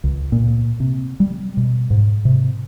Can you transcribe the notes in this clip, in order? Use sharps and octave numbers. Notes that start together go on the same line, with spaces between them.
C#2
A#2
C3
G3
B2
G#2
C3